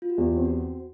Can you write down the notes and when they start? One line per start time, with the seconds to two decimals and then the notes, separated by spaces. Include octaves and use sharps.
0.02 F4
0.10 F#4
0.18 E2 G4
0.36 C4
0.45 F#4